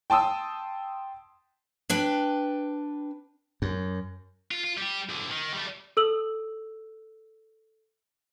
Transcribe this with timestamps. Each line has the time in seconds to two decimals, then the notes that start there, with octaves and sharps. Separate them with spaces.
0.10 G5 A5 C6 D#6 E6
1.90 D4 B4 G5
3.62 F#2
4.51 F4
4.64 F4
4.78 G3 G4
5.09 B1 D3
5.31 D#3
5.54 G3 A3
5.97 A4 E6 F#7